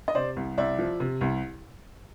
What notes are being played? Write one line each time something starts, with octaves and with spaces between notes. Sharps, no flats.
D#5
C3 C5 D5
C2
C2 D5 E5
F3
C3
C2